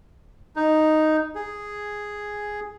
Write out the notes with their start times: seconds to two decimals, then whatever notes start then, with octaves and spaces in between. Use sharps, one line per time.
0.56 D#4
1.35 G#4